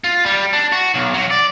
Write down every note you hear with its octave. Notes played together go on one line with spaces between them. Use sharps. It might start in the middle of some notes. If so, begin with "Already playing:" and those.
F4
G3
D4
F#4
B1
F#3
D5